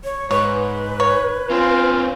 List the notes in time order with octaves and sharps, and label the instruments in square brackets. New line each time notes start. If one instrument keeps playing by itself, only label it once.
[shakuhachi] C#5
[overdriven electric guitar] G#2 [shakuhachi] B4 [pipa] C#5
[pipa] C#5
[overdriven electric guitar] C4 C#4 [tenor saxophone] F4